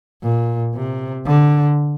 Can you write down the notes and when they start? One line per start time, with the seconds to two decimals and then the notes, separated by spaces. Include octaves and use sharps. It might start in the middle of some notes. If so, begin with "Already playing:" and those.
0.23 A#2
0.75 C3
1.26 D3